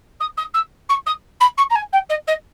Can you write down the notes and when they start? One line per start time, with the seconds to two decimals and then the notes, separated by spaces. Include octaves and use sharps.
0.20 D#6
0.37 D#6
0.54 E6
0.89 C#6
1.06 D#6
1.40 B5
1.57 C#6
1.70 A#5
1.75 G#5
1.92 G5
2.09 D#5
2.27 D#5